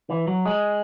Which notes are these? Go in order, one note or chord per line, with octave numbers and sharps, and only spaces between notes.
E3
F#3
G#3